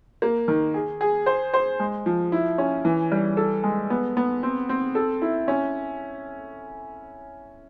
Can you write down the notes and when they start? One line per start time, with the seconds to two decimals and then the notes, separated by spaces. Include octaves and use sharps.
0.22 A#3
0.48 D#3
0.74 G#4
1.01 G#4
1.26 C5
1.54 C5
1.80 G#3
2.06 F3
2.32 E4
2.58 C#4
2.85 E3
3.12 G3
3.37 A4
3.63 G#3
3.90 B3
4.17 B3
4.43 C4
4.69 C4
4.95 A4
5.22 E4
5.48 C#4